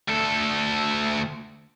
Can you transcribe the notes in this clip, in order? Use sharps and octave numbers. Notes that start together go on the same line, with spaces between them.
D2 A4